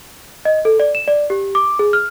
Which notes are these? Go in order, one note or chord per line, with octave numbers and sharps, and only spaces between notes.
D#5
A4
D5
E7
D5
G4
D6
G#4
F6